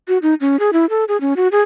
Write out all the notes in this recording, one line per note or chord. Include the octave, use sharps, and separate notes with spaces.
F#4
D#4
C#4
G#4
E4
A4
G#4
C#4
F#4
G#4